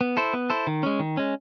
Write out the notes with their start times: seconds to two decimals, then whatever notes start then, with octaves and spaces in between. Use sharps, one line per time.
0.01 B3
0.17 E4 A4 C5
0.33 B3
0.50 E4 A4 C5
0.67 D#3
0.83 G#3 C#4
0.99 D#3
1.17 G#3 C#4